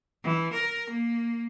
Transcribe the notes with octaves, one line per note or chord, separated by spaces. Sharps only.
E3
A#4
A#3